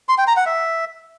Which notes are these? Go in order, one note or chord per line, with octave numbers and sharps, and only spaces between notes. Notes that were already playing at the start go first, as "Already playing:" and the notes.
C6
G5
A#5
F#5
E5